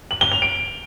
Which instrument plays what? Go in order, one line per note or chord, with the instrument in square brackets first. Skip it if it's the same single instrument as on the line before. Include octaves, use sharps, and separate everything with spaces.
[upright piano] F#7
G7
F7
D7